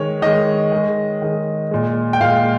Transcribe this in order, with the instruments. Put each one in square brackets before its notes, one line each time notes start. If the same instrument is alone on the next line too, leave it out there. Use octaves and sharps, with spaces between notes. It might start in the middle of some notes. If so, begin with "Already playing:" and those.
Already playing: [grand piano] D#3 G#3 C#5
D#3 G#3 D#5
D#3 G#3
D#3 G#3
A#2 G#3
G5
A#2 G#3 F5